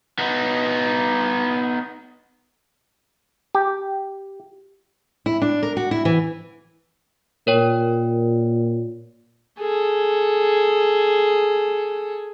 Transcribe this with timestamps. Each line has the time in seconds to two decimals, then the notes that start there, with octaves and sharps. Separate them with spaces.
0.19 B3 D#4
3.55 G4
5.26 E4
5.42 D4
5.63 A#4
5.77 F#4
5.91 E4
6.05 E3
7.47 A#2 A#4 C#5 G5
9.60 G#4 A4